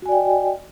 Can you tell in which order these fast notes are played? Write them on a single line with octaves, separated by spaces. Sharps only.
F#4 G#5 D5 G5 D#5